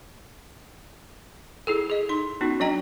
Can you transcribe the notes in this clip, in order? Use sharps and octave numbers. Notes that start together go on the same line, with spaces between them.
E4 G#4 A4
G#4 D#5
D#4 C6
B3 C#4 D#4 F#4
F#3 D4 D#5 G5 A#5